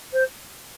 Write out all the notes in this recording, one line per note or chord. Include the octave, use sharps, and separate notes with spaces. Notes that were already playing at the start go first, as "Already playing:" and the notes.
C5